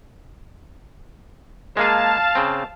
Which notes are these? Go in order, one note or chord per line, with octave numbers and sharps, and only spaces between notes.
G#3 A#3 G#4 F5 A5
C#3 C4